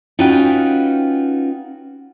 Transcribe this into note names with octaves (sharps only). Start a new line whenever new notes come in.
C#4 D#4 F4 F#4 B4 G5